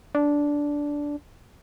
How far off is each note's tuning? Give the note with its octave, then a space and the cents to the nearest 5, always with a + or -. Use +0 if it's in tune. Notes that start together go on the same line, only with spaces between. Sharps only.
D4 -10